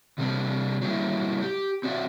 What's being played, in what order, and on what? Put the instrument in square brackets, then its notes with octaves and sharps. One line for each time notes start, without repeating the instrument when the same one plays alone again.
[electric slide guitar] C3 G3 A#3 C4 D4
F#3 G3 A#3 E4
G4
C4 F#4 D5 E5